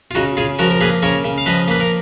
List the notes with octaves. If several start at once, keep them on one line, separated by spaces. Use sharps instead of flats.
F4
C#3 D#4 F#4
C#3 F4 G#4
F3 F#4 A#4
A#4
A#3 G#4 B4
C#3 A#4 C#5
C#3
F5
F3 B4 D#5
A#3 B4
A#4